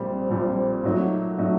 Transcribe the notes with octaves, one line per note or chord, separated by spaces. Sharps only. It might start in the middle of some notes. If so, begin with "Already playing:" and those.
Already playing: A#1 A#2 G3 C4
A#1 A#2 G3 C4
A#2 F#3 A3 D#4 F#4
A#2 F#3 A3 D#4 F#4